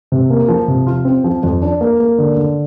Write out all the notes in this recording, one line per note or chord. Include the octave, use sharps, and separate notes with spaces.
C3
A#3
F3
C3
F4
C4
F3
F2
D4
A#3
A#3
D3
D3